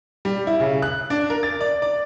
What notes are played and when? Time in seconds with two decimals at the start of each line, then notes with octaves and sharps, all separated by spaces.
0.25 G3
0.47 E4
0.60 C#3
0.82 F#6
1.10 D4
1.30 A#4
1.43 A6
1.61 D5
1.82 D5